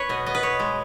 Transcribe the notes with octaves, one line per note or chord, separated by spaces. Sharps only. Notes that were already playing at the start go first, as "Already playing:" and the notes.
Already playing: B4 C#5
B2 D#5
B3 D#5
B4
B2 C#5
G#3